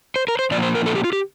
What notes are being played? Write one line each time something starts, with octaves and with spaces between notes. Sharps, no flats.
C5
A#4
C5
A#2 F3 A#3 F4 D5
C5
A#4
A4
G4
F4
G4